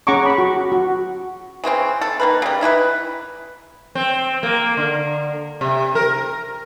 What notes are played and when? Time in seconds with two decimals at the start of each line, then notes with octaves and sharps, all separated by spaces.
0.07 C#4 G#4 F#5 A#5 C#6 D6
0.26 B5 C#6
0.38 F#4
0.72 F#4
1.64 C#3 E3 C4 C#4
2.01 A4
2.20 D#3 A#3 B4
2.42 C#3 G3
2.61 D#4 E4 G4 B4
3.95 C4
4.43 A#3
4.77 D3
5.61 C3
5.95 A#4